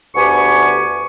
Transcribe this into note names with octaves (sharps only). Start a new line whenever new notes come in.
D2 B3 G4 G#5 C#6